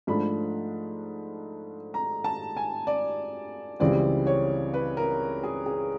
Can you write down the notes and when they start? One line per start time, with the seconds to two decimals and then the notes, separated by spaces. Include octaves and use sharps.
0.07 G#2 F3 A3 D4 B5
1.94 A#5
2.24 A5
2.57 G#5
2.87 D5
3.80 C#2 C#3 E3 G3 C4 D5
4.27 C#5
4.74 B4
4.97 A#4
5.43 G#4
5.66 G#4